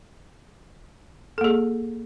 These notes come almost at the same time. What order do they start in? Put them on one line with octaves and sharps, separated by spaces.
A4 A#3 G#4